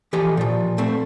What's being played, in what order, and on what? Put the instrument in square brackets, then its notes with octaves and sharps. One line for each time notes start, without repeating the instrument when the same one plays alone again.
[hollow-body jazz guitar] E3 F3 G4 A4 D#5
A#2 F3
A3 C4